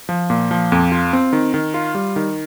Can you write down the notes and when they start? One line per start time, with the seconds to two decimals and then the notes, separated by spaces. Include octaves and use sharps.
0.09 F3
0.30 A#2
0.51 F3
0.72 F2
0.92 F4
1.13 C4
1.33 D#3
1.54 D#3
1.74 F4
1.95 G3
2.16 D#3